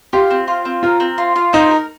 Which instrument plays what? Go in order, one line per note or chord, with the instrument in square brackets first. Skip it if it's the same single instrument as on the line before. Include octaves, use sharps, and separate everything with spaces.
[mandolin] F4 [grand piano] G4
[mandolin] C4
F4
C4
[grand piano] F4 [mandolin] A#4
[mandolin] C4
F4
F4
[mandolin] C4 [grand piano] D#4
[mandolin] A#4